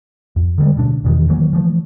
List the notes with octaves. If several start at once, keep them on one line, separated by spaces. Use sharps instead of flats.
F2
D3 D#3 G3 G#3
D2 B2 D4
E2 B2 D#3 E3
D#3 E3 F#3 A#3
E3 F3 A3